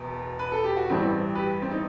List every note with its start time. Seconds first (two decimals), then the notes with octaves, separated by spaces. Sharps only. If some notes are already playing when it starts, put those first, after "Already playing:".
Already playing: E1 E2 B2
0.39 B4
0.52 A4
0.64 G4
0.77 F#4
0.90 A1 G2 E3 G3 C4 E4
1.35 G4 B4
1.62 C4
1.71 D#4